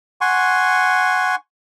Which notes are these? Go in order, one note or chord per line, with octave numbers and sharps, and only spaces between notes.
F#5 G#5 C6 C#6